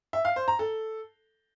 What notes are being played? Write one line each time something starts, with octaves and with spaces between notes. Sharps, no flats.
E5
F5
C5
A#5
A4